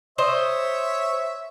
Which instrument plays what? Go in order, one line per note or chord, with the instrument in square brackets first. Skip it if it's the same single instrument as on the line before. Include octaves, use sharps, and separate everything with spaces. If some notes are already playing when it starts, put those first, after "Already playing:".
[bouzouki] C5 D#5 [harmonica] C#5 E5